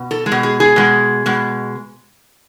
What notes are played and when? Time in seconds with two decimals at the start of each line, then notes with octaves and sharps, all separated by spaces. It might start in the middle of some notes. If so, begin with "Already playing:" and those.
Already playing: B2
0.11 A4
0.26 G#3 G#4
0.32 B2
0.43 G#4
0.60 G#4
0.76 B2 G#3
1.26 B2 G#3